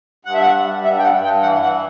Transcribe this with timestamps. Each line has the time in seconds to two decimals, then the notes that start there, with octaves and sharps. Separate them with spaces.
0.25 G2 F#5
0.34 E5
0.42 F#5
0.55 G3
0.84 G2 E5
0.99 G5
1.03 F#5
1.13 G2
1.23 G5
1.42 E3 F#5
1.62 F#5